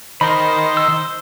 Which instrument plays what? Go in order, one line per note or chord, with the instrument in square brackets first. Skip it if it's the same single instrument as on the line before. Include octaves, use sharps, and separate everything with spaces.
[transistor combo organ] D#3 [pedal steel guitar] A#4 B5 [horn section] C5
[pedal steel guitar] E6